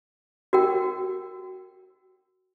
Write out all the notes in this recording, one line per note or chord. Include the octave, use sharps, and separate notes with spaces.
F#4 A#4 G5